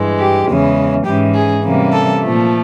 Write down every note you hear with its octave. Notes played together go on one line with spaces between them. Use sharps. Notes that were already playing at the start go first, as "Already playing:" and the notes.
Already playing: G2 E3 G#3
G4
E2 C#3 E3 G#3 C#4
G#2 E3 G#3 C#4 G4
G#4
C3 E3 G3 A#3 C#4
A4
A#2 F3 A3